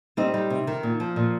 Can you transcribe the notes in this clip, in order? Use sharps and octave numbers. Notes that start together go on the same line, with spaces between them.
G3 C4 D#4
G3
C3
D#3
A#2
F3
A#2